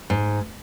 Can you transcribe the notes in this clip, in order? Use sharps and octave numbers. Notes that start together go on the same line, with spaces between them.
G#2